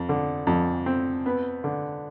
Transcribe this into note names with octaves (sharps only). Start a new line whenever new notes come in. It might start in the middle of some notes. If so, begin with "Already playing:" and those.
Already playing: F2
D3
F2
C4
B3
D3